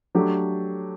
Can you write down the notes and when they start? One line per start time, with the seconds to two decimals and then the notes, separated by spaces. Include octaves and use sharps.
0.15 F#3 A3 D4 G4